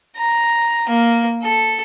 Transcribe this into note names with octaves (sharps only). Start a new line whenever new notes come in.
A#5
A#3
A4